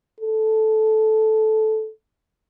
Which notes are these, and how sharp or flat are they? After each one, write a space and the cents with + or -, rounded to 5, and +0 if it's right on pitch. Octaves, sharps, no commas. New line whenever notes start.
A4 -10